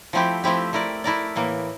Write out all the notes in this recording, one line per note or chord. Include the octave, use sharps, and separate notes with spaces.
F3 A3 C4 E4 G4
F3 A3 C4 E4 G4
A3 E4 A#4 D5
A3 E4 A#4 D5
A2 E3 A#3